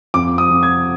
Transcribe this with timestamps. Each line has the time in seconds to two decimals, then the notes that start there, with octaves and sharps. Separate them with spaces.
0.14 F2 D6
0.38 D#6
0.51 F2
0.63 G#6